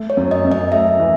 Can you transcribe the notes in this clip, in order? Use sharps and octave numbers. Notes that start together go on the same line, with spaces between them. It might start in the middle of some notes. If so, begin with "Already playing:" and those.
Already playing: A3
C#5
F#2
D#5
F#2
D#5
A3 E5
E3